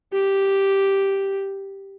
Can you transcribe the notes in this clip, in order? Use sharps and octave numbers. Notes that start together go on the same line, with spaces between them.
G4